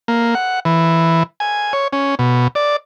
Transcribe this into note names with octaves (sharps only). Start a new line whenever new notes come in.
A#3
F#5
E3
G#5
C#5
C#4
B2
D5